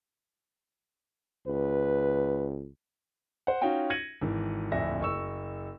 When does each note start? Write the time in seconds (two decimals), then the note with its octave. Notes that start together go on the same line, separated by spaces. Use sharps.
1.47 C#2 B4
3.47 C5 F#5
3.61 C#4 D#4 F4 F#4 G5
3.90 G#6 A#6 C#7 D#7 F#7
4.21 G#1 E3
4.72 D1 A#1 F2 E5 A#6
5.01 F#1 C#6 E6